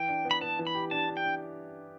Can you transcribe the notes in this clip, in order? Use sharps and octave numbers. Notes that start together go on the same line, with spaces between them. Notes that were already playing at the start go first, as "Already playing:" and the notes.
Already playing: E3 G5
D4
B3
B5
B3 A5
E3
B5
G4
D4 A5
D4
G5
D4